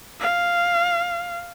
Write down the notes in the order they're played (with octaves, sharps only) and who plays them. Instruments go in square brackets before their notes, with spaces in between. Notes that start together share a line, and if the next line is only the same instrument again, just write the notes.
[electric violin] F5